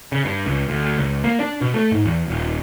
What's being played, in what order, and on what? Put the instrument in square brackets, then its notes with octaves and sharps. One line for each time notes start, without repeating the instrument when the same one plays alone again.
[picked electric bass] C#3
G2
C#2
D2
C#2
A#3
D4
B2
A3
G#2
E2
D#1